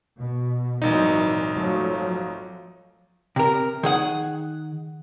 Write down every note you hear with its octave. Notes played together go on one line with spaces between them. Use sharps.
B2
G#1 A#2 E3 F#3 D#4
F3 F#3 A3
C3 A#4
D#3 G#4 F#5